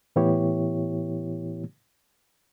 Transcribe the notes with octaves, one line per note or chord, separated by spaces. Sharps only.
A2 E3 B3 E4 G4 C#5